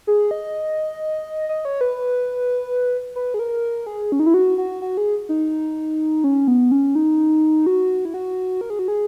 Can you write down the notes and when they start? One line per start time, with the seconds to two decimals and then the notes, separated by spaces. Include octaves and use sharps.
0.07 G#4
0.31 D#5
1.49 D#5
1.65 C#5
1.81 B4
3.16 B4
3.34 G#4
3.39 A#4
3.86 G#4
4.12 C#4
4.20 D#4
4.26 E4
4.34 F#4
4.58 F#4
4.82 F#4
4.97 G#4
5.29 D#4
6.24 C#4
6.48 B3
6.71 C#4
6.95 D#4
7.66 F#4
8.05 E4
8.14 F#4
8.61 A#4
8.70 G#4
8.79 F#4
8.88 G#4